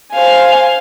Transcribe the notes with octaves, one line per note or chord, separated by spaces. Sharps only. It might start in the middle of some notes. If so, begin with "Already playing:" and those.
C5 F5 G#5